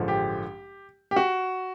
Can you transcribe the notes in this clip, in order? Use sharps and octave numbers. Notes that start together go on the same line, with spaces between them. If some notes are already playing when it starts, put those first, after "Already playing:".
Already playing: A1 G2 D3 F3 G#3
G4
G4
F#4